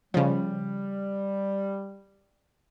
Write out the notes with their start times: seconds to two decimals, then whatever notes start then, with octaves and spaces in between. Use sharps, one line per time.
0.14 C#3 F3 G3